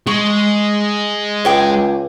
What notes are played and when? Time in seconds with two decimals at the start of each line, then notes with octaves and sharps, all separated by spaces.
0.07 G#3 C#6
1.45 C#2 C#5 G5 D6